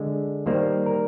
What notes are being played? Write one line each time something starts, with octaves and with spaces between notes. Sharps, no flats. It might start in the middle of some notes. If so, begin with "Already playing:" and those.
Already playing: D3 G#3
D#3 G3 A#3 C5
A#4